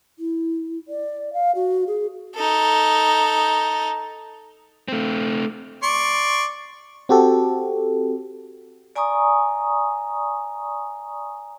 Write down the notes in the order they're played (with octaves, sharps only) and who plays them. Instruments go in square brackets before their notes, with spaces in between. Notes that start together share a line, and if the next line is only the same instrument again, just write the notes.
[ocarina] E4
D5
F5
F#4
G#4
[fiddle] D#4 A4
[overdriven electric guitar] A3 C4
[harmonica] D5 C6 C#6
[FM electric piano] C4 F#4 G4 A4
[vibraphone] D5 G#5 A#5 C#6 D#6